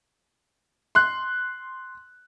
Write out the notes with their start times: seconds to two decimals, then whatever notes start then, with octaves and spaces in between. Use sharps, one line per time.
0.95 C6 F#6